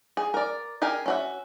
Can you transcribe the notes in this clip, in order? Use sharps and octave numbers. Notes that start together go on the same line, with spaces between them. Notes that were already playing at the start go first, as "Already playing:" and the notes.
G#4
A#4 D5
G4 G#4 A#4 G#5
C#4 F#4 E5